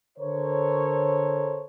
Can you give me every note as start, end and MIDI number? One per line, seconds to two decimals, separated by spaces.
0.18 1.66 50
0.18 1.66 69
0.18 1.66 70
0.18 1.66 72
0.18 1.66 73